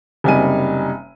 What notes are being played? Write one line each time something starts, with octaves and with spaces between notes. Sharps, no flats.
F#1 C3 G3 D#4 G#5 D#7